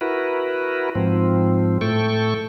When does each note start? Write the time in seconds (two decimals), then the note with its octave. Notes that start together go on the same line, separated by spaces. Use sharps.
0.01 E4 F#4 A#4 B4
0.95 G#2 F3 C4
1.81 A2 A3 A4 G5 C#6